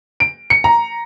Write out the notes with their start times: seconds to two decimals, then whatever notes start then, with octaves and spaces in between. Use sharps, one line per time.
0.20 D7
0.50 C#7
0.64 A#5